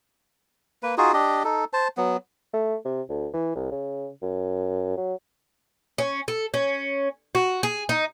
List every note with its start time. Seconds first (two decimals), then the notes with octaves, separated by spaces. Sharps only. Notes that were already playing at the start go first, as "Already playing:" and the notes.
0.83 A#3 B4
0.98 D#4 F4 F#4 G#4
1.13 D4 G4 D#5
1.44 D#4 A4
1.73 C5 A5
1.97 F#3 B3
2.53 A3
2.85 C3
3.09 D2
3.33 E3
3.55 C2
3.71 C#3
4.22 F#2
4.97 F#3
5.98 C#4
6.28 A4
6.54 C#4
7.35 F#4
7.63 G#4
7.89 D#4